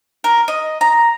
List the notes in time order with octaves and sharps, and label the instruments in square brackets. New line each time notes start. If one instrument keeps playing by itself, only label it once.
[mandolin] A#4
D#5
A#5